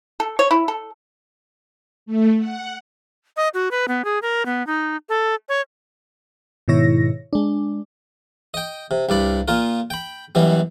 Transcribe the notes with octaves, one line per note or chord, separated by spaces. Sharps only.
A4
C#5
E4
A4
A3
F#5
D#5
F#4
B4
B3
G#4
A#4
B3
D#4
A4
C#5
G#2 B2 D#3 E4 C#5 A#6
G#3 D4
D#5 G5
C3
C2 G2 D5 B5
A#2 F4 A#4
G5 B5
F#2 B2 E3 G3